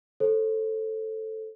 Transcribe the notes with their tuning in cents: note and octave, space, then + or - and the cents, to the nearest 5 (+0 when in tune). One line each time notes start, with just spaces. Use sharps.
A4 +0 C5 +35